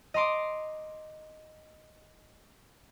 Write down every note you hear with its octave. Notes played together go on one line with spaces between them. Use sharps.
D#5 A#5 C6 D6